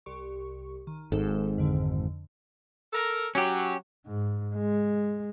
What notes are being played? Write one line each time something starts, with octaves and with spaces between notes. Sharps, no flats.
C2 G4 C#6
D#3
G#1 G#2 A4
F2 D3
A4 A#4
F#3 C#4 G4
G#2
G#3